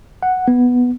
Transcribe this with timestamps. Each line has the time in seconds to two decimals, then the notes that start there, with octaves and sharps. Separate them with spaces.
0.23 F#5
0.48 B3